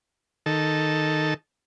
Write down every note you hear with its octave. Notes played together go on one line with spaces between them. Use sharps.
D#3 A4